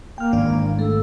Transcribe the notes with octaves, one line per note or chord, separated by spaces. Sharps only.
A#3 G5 F6
G#1 E2 D4
A3 A4